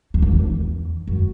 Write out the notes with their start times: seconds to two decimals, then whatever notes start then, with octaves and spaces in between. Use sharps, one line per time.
0.14 F2
0.22 E2
0.40 E2
1.07 F#2